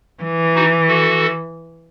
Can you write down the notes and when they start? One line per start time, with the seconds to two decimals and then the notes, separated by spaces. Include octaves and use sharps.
0.23 E3
0.55 D#4 F#4
0.88 F#4 A4